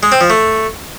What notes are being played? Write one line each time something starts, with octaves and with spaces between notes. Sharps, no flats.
G#3
C4
F3
A3